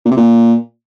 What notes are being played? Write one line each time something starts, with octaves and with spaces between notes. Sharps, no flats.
A#2
C3
A#2